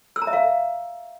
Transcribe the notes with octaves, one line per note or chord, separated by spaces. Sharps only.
E6
A#5
E5
F5